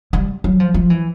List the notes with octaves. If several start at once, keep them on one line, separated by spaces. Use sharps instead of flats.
G3
F#3
F3
F3
E3